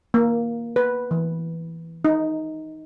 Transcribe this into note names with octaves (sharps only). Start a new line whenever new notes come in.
A#3
B4
E3
D#4